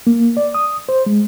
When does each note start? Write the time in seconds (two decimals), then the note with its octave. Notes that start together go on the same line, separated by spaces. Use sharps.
0.07 A#3
0.37 D5
0.54 D#6
0.89 C5
1.06 G#3